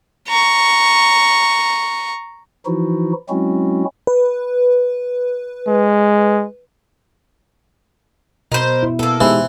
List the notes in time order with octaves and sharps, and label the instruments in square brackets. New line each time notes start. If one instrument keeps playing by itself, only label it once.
[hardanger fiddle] A#5 C#6
[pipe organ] E3 F3 D#4 E4 F#4
F#3 G#3 C4 C#4 E4 F#4
[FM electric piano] B4
[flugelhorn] G#3
[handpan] B2 [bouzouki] A#4 C5 [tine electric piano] D#5 B5 C6
[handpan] E4
[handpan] B2 [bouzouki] A#3 A4 [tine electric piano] B3
[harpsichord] E3 [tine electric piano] G#3 D#4 G4 [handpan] B3 C5